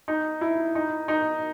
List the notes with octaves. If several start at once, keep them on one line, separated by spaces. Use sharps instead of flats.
D#4
E4
D#4
D#4